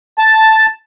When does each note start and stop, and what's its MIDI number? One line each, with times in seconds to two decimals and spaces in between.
0.18 0.66 81